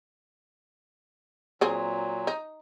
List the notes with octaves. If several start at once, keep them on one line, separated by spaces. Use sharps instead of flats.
A#2 F#3 C4 G#4
D#4